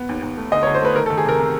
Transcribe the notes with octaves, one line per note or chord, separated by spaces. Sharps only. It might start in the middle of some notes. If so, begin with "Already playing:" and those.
Already playing: B3
D#2
D#2
A3
D3 D#5
C#5
D3
C5
A3 B4
D#3 A#4
A4
D#3
G#4
C3 A#4
C3